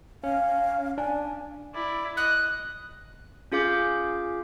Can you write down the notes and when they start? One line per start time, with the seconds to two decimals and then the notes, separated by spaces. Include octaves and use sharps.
0.24 C#4 F5
0.98 D4 G#5
1.74 E4 D5
2.17 D#5 F#6
3.52 C#4 F4 G#4 F5 D6 G6